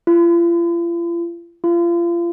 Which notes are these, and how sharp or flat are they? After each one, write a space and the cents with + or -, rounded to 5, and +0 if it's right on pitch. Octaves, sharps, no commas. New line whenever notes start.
F4 -40
F4 -30